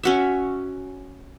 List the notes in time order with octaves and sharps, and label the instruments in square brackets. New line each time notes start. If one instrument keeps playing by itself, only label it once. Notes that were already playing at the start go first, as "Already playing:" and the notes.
[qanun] C#4 F#4 E5